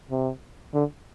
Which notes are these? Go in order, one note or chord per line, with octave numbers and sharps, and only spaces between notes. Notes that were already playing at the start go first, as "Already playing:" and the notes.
C3
D3